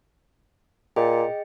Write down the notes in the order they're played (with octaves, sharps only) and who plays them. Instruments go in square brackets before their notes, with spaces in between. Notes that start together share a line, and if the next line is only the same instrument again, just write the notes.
[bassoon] A#2 [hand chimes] G#4 D#5 G5